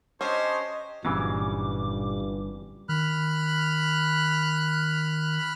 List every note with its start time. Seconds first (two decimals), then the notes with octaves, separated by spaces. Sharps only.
0.21 C#4 D4 G4 C5 C#5 D#5
1.05 G1 G2 A#2 C#3 E3 F#3 C4 D6
2.89 D#3 B5 F6 F#6